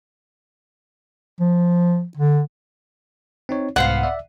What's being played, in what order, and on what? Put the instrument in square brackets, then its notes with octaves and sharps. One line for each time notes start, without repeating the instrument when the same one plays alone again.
[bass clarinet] F3
D3
[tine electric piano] C4 D#4 C#5
[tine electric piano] C2 G#2 [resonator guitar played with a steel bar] B3 C5 F5 [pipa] F#5
[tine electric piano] D5 E5